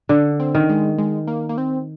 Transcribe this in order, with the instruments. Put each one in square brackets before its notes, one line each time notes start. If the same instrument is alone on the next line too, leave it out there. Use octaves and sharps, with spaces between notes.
[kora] D3 [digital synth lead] D4
[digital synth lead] C4
[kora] D#3
[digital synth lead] G#3
G#3
A#3
A#3
C4